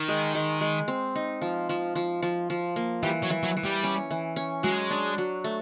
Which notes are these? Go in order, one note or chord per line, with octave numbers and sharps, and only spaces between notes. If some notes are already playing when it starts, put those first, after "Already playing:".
Already playing: D#3
G#3
G#3
G#3
C4
D#4
F3
F3
F3
F3
F3
A#3
E3 G3
F#3
E3
F#3
E3
G3
C#4
E3
C#4
F#3 G#3
D4
F#3
A3